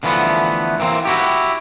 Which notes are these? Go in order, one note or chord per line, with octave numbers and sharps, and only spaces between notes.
D3 E3 F3 A3 B3
E3 A#3 C4
E4 F#4 G4